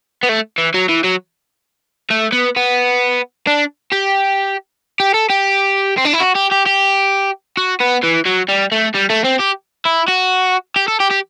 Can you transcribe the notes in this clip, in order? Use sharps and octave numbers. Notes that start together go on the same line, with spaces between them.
B3
A3
E3
F#3
E3
F#3
A3
B3
B3
D4
G4
G4
A4
G4
C4
D4
E4
F#4
G4
G4
G4
F#4
B3
E3
F#3
G3
A3
G3
A3
C4
G4
E4
F#4
G4
A4
G4
G4